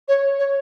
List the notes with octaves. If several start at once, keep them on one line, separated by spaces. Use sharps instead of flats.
C#5
C#5